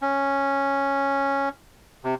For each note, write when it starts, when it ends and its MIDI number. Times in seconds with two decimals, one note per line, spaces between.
0.02 1.49 61
2.04 2.15 48